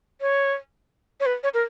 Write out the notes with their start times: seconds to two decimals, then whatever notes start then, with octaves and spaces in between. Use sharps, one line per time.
0.21 C#5
1.20 C#5
1.26 B4
1.43 C#5
1.54 A#4